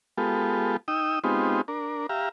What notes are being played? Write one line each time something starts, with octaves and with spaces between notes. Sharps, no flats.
G#3 B3 F4 G4 A4
D#4 G5 D#6 E6
G#3 B3 C4 D#4 F4 G4
D4 A#4
G4 E5 F5 A#5